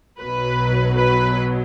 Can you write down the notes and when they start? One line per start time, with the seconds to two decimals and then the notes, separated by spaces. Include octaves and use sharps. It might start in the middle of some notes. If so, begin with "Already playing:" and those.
0.20 B1 B2 F#3 B4
0.98 B4